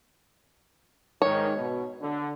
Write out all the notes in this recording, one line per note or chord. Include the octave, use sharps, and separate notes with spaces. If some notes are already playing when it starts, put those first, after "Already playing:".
G#2 D#3 C#5
B2
D3